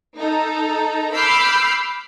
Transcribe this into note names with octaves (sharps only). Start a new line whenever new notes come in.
D#4 A4 A#5
B5 D6 E6 F6 G6 C7